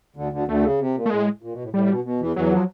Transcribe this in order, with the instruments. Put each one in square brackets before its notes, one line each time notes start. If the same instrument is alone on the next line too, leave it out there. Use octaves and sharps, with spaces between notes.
[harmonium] D2 D3
D2 D3
[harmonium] D2 D3 [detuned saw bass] A3
[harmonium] C#3
C3
A#2
[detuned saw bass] A3
[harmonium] A2 [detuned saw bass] G#3
[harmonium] A#2
B2
A2
[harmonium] A2 [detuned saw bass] G3
[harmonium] B2
B2
E2 E3
[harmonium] E2 E3 [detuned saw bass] F#3
[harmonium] F3